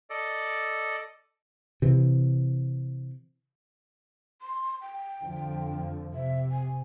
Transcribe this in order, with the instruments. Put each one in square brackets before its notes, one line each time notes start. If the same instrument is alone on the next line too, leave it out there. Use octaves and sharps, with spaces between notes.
[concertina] A4 D5 D#5
[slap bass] C3 E3
[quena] C6
G5
[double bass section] F2 D3 F3
[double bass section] C3 [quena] E5
[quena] G#5